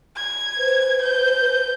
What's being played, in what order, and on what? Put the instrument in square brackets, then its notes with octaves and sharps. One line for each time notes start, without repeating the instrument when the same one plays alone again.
[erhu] G#6
[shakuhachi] B4 [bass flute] C5
[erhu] G6